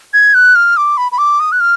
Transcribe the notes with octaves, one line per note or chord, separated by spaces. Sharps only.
G#6
F#6
F6
D6
B5
B5
D6
D#6
F#6
F6